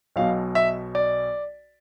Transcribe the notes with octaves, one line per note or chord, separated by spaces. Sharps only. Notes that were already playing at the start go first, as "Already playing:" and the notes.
B1 B2 F5
E5
D5